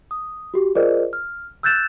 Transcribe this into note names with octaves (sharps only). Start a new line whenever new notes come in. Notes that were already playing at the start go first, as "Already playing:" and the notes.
D#6
F#4 G4
F4 G#4 A#4 C5 D5 D#5
F6
E6 F#6 G6 A6 E7